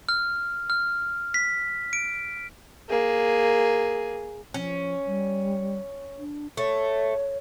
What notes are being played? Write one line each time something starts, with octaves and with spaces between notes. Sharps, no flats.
F6
F6
B6
D7
A#3 G#4
F3 C#4
G3
D4
A3 C#5